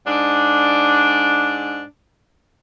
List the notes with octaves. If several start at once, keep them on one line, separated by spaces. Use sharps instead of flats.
G#2 D4